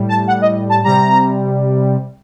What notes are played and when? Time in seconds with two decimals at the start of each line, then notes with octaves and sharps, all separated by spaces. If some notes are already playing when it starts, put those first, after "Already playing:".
Already playing: A2 G3
0.09 A5
0.27 F#5
0.42 D#5
0.70 A5
0.84 C3 G3 A#5